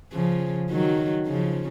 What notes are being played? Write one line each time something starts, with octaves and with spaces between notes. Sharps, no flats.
C#3 F3
D#3 F#3
C#3 F3